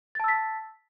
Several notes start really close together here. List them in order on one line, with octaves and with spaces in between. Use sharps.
A6 A5 E6 B6